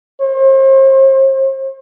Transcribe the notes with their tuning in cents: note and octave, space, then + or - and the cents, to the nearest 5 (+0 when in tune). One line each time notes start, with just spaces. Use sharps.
C5 +40